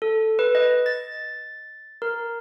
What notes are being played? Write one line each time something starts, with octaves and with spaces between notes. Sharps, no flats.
A4
B4
D#5
A6
A#4